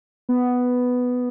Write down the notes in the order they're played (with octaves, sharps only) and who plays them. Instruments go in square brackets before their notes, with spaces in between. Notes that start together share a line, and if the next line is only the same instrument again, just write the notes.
[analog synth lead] B3